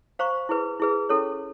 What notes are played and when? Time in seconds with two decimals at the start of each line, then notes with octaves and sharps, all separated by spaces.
0.19 C5 F5 A#5 C#6
0.49 E4 G#4 B4
0.80 E4 G#4 B4
1.09 C#4 E4 A4 C#5